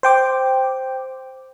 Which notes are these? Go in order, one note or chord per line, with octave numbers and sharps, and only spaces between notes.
C5 G5 D6